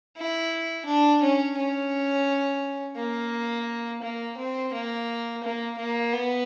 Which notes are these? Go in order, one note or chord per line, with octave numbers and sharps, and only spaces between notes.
E4
D4
C#4
C#4
A#3
A#3
C4
A#3
A#3
A#3
B3